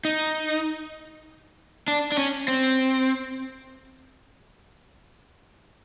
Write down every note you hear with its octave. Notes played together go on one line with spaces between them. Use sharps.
D#4
D4
D4
C#4
C4